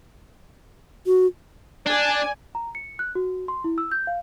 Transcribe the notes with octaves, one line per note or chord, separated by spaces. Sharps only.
F#4
D4 D5 G#5
A#5
C#7
F#6
F#4
C6
E4
E6
G6
F5